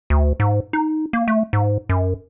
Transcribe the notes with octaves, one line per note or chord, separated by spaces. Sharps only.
D2
G#2
D#4
A#3
A3
G#2
F#2